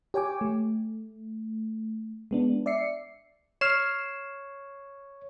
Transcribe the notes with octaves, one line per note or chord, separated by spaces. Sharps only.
G4 C#5 G5 G#5 D6
A3
G#3 B3 D4
D5 E5 C7 C#7
C#5 F6 C7 E7